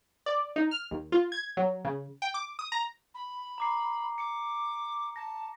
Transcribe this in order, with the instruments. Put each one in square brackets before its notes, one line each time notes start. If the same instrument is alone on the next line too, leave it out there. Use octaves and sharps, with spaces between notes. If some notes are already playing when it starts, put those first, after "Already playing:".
[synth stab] D5
D#4
F6
D#2
F4
G#6
F#3
C#3
G5
D6
D#6
A#5
[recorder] B5
[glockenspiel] A#5 D6 C7
[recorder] D6 [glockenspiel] C#7
[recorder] A5 [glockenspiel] A#6